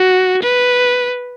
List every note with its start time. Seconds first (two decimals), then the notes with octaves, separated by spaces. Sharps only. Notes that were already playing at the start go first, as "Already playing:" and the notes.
Already playing: F#4
0.43 B4